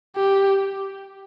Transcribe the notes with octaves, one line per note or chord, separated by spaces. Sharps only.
G4